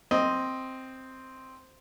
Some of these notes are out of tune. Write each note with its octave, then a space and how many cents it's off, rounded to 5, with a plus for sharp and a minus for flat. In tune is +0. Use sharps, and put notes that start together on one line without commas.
C4 +0 D#5 +0